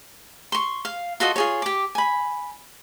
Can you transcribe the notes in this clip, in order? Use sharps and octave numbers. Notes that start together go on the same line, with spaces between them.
C6 C#6
F5
F4 F#4 A4 D#5
F4 G#4 C#5
G4 D6
G#5 B5